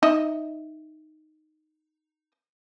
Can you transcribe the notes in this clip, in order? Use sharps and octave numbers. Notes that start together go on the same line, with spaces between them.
D#4 D#5 E5